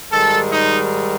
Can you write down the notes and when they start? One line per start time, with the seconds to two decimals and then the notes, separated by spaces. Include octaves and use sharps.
0.12 G#2 D#3 G3 A4
0.52 D#4